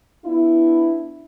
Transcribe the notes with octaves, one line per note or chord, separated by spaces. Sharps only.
B3 D4 E4